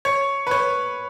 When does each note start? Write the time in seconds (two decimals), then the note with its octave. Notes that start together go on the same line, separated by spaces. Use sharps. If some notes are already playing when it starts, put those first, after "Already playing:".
0.05 C#5
0.47 B4
0.51 C#5